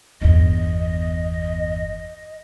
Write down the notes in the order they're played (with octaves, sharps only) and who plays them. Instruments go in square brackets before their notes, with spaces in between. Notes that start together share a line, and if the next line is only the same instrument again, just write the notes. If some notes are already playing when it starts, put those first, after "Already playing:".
[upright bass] G1 E2 [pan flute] D#5